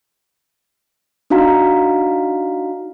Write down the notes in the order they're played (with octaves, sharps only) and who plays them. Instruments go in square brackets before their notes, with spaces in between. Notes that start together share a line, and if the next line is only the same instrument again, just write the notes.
[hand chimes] D4 D#4 F#4 F5 A#5